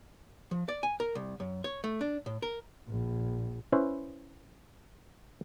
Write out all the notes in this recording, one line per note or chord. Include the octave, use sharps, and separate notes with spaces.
F3
D5
G#5
A#4
C2
F#2
C#5
A3
D4
A2
A#4
A#1
C#4 E4 B4 C5